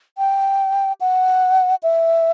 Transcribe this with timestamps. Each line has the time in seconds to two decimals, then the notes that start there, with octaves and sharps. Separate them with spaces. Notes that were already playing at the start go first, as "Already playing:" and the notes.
0.18 G5
1.01 F#5
1.83 E5